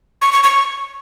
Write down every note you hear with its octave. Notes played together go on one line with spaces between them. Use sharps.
C#6
C#6
C#6